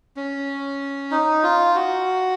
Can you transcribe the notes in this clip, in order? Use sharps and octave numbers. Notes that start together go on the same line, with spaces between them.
C#4
D#4
F4
F#4